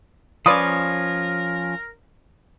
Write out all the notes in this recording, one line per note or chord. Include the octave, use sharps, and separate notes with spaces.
F3 C#4 F4 A#4 B4 D5 D#6